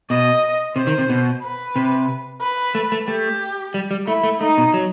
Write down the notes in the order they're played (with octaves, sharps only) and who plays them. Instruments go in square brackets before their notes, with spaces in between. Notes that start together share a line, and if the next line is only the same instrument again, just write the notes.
[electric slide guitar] B2 [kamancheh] D#5
[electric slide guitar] C3 [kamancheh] C5
[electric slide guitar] D#3
C3
B2
[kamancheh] B4
[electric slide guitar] C3
[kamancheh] B4
[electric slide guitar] A3
A3
[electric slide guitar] A3 [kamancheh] G4
[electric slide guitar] G3
G3
[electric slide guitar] A3 [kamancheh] E4
[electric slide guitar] A3
[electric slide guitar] A3 [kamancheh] D#4
[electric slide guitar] B2
F#3